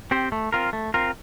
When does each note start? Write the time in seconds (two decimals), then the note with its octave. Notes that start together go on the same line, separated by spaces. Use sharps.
0.11 C4 G4 C5
0.32 A3
0.53 C4 F4 A#4
0.73 A3
0.94 C4 F4 A#4